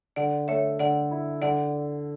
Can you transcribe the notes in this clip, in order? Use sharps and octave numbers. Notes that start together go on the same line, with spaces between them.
D3 D5 F#5
A3 C#5 E5
D3 D5 F#5
E4
D3 D5 F#5